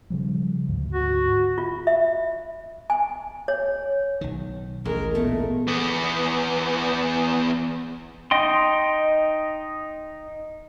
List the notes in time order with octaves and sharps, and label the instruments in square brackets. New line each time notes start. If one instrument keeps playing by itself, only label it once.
[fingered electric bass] C#3 F3 G3
D2 G#2
[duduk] F#4
[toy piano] F4
E5
G#5
C#5
[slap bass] B1 D#3
[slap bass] A1 D2 [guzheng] G#3 [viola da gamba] A#4
[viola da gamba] A#2 [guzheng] A3 [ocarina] B3
[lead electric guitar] E2 B3
[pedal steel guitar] D#4 D#5 G5 C6